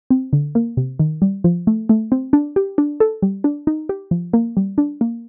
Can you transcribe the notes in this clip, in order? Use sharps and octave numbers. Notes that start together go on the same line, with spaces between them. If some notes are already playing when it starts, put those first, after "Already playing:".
C4
D3
A#3
C3
D#3
G3
F3
A3
A3
C4
D4
G4
D4
A4
G3
D4
D#4
G4
F3
A#3
G3
D4
A#3